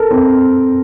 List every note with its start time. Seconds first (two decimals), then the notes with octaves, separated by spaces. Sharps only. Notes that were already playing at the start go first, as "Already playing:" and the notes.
Already playing: A4 A#4
0.11 C4